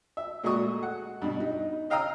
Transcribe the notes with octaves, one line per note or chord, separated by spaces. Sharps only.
E5
A#2 G#3 A3 F#4 C#6 D#6
F#5
G2 B2
D#4
D#5 F5 G5 A#5 D#6 E6